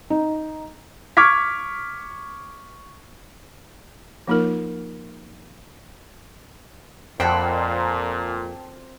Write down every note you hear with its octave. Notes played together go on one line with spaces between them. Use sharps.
D#4
C#6 D6 F6 G#6 B6
F3 A#3 D#4 F4 A#4
F2 A#2 C4 F#5 G5 A5 B5